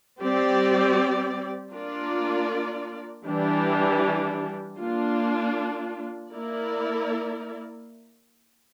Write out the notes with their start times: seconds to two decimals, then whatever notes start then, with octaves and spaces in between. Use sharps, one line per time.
0.21 G3 C4 G4 D5
1.73 A#3 D4 F4 A#4 D5
3.26 E3 G3 D4 G4
4.79 A#3 D4 F4
6.32 A#3 E4 A#4 D5